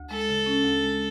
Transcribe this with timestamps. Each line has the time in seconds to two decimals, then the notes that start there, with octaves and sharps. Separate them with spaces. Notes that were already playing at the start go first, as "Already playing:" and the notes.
Already playing: D2
0.11 G#3 A4
0.29 C#3
0.46 C#4
0.64 D2
0.83 G#3